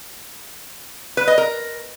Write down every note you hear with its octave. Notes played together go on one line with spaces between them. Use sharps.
B4
D#5
A#4